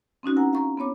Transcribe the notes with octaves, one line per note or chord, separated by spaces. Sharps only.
C4 C#4 D#4 F#4
E4 A#4 F#5 G#5 A#5
F5 A#5 C#6
B3 C4 C#5 D6